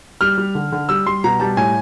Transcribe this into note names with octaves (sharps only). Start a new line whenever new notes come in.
G3 F6
G3
D3
D3
G3 E6
G3 C6
B2 A#5
G3 A5
A2 G#5